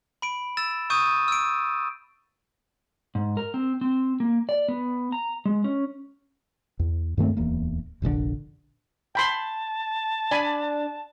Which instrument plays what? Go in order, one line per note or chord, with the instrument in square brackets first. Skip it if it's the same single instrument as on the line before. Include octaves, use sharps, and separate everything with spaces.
[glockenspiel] B5 D7
E6 A6 E7
C#6 D#6 G6 D#7
E6 D7
[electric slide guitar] G#2
A#4
C4
C4
A#3
D5
B3
A#5
G#3
C#4
[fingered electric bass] E2
G2 D#3 A3 C4
D1 E2 A#3
F1 A#1 A#2 D3
[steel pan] G5 B5 C6 [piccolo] A5
[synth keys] D4 [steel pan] G#5 B5